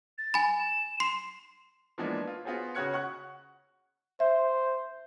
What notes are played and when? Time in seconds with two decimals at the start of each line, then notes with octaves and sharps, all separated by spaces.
0.18 A6
0.34 G#5 B5
0.59 E7
1.00 C6 C7
1.98 E3 F3 G#3 A#3 B3 D4
2.27 F4
2.45 B3 F4 F#4 G#4 C5
2.75 C#3 F#4 C#5 F#6 G#6 C#7
2.93 F#5 C#6 F#6
4.20 C5 E5